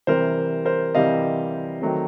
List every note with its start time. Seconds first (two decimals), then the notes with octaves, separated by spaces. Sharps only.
0.07 C3 E3 G3 A#4 C5
0.65 A#4 C5
0.95 C3 E3 G3 D#5 F5
1.81 D#3 F#3 A3 C4